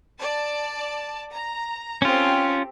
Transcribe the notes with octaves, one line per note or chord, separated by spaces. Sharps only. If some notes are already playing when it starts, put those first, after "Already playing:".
D5 A5
A#5
C4 C#4 F4 G4 A4